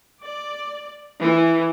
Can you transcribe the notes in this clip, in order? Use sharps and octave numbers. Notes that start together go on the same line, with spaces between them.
D5
E3